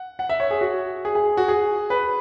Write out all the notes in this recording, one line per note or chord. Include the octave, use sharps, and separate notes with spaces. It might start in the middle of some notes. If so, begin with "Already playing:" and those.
Already playing: F#5
F#5
E5
C#5
G#4
F#4
G#4
G#4
F#4
G#4
B4